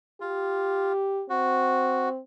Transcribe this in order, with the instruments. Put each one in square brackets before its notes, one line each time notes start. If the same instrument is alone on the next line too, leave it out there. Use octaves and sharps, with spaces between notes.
[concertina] F4 [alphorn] G4
[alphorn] C4 [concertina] F#4